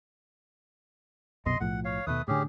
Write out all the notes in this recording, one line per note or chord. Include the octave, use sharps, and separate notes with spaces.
C2 F#2 B2 D#5 C6
B1 A2 F3 F#5
C#5 F5
D#2 B2 A3 B4 D#6
A2 D3 C#4 G4 G#4